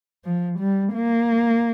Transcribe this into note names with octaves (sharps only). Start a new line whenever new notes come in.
F3
G3
A#3